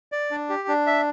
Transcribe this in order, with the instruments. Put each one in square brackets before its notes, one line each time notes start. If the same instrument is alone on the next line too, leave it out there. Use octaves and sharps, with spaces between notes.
[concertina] D5
D4
G4
D4
E5